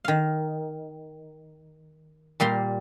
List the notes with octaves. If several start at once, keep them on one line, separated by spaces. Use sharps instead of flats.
D#3 F5
A#2 G3 A#3 C6